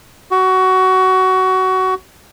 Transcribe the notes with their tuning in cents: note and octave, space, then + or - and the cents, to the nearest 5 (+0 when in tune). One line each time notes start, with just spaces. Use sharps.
F#4 +20